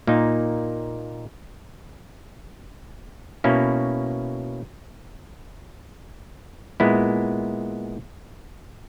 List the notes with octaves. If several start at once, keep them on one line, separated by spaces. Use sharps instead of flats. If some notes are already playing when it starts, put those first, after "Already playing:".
A#2 A#3 D#4
B2 A#3 C#4 E4
A#2 G#3 B3 E4